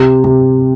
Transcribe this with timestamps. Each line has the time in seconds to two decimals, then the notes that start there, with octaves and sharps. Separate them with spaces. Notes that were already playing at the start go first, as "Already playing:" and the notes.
Already playing: C3
0.24 C3